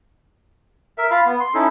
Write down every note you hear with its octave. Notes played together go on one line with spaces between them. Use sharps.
A#4 E5
F4 F5 B5
B3
C6
C#4 D#4 E4 A4